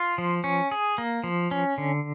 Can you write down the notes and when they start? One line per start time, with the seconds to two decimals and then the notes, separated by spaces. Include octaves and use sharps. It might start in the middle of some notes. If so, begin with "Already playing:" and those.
Already playing: F4
0.18 F3
0.44 C#4
0.71 G#4
0.98 A#3
1.24 F3
1.51 C#4
1.78 D3